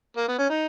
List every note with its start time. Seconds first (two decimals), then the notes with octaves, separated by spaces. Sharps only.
0.17 A#3
0.28 B3
0.39 C#4
0.49 D#4